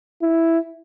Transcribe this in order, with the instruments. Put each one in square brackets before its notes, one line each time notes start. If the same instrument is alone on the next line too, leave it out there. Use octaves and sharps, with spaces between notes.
[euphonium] E4